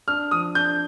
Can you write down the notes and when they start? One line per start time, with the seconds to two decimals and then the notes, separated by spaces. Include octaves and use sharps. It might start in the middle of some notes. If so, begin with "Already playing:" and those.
0.08 D4 F6
0.31 F3 D#6
0.55 D4 G6